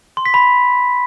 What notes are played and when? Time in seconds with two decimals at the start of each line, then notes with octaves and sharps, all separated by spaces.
0.17 C6
0.25 B6
0.34 B5